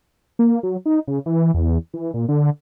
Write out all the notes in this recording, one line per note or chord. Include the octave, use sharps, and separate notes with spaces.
A#3
F#3
D#4
C#3
E3
E2
E3
A#2
D3